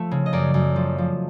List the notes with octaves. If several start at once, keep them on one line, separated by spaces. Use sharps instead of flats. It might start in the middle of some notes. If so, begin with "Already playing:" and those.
Already playing: F3 A3
C#3
D#5
F#2 D5
F#2
F3
F3